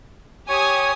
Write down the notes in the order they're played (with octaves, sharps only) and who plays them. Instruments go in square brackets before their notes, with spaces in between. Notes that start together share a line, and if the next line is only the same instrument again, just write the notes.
[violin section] G4 G#5 D#6 [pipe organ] C#5